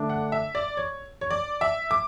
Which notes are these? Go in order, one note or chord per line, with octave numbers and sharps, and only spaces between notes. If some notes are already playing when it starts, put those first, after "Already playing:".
Already playing: D3 A3 D4
F#5
E5
D5
C#5
C#5
D5
E5
D6